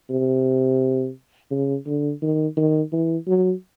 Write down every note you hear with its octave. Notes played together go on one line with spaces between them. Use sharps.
C3
C#3
D3
D#3
D#3
E3
F#3